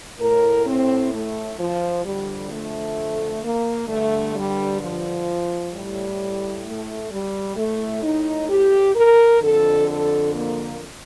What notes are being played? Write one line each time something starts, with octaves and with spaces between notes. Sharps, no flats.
A2 A#4
C4
A3
F3
F2 D3 G3
A3
A#3
G2 D3 A3
G3
F3
A2 G3
A3
G3
A2 A3
D#4
G4
A#4
F2 D3 A4
A4
A#3